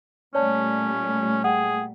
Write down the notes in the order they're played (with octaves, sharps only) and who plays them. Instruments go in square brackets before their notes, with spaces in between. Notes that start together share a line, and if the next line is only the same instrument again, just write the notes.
[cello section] A#2 G3 A3 [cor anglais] C#4 [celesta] C#5 D5 A5
[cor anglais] G#4 [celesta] F#5 G5